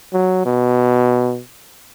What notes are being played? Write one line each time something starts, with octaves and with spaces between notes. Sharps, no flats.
F#3
B2